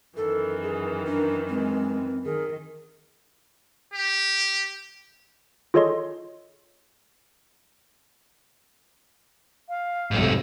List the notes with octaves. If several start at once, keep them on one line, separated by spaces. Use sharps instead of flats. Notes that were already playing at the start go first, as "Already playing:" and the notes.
F#2 D#3 E3 A4
G#4
D4 A#4
G#3 C4
D#3 G#4 A#4
G4
F4 G#4 A4 C#5 D#5 C6
F5
B1 F2 G#2 C3 A3